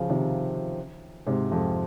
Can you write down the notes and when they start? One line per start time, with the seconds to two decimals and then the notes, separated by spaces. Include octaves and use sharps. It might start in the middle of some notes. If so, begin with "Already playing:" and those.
Already playing: C#3 F3
0.10 C3 D#3
1.27 G#2 C3
1.51 F2 G#2